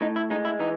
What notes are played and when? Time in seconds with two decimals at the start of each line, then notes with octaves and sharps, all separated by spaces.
0.01 A2 D#4
0.16 E4
0.30 G#3 D#4
0.45 E4
0.59 E3 D#4